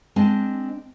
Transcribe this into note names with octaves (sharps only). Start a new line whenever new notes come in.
G#3 C4 D4 D#5 A5